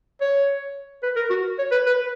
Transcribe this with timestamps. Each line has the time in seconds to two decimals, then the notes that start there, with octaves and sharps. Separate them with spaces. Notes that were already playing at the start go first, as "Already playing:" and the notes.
0.21 C#5
1.03 B4
1.16 A#4
1.30 F#4
1.59 C#5
1.71 B4
1.86 B4